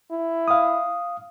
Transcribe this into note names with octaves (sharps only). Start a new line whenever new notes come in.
E4
F5 D#6